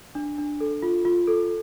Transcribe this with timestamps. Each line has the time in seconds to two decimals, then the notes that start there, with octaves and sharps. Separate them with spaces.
0.15 D4
0.38 D4
0.60 A4
0.82 F4
1.05 F4
1.27 A4